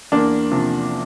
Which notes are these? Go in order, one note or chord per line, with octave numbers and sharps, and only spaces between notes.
E2 A#3 D4
C3 F3